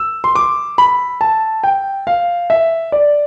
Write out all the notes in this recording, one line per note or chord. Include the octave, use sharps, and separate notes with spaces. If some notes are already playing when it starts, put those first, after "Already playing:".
Already playing: E6
C6
D6
B5
A5
G5
F5
E5
D5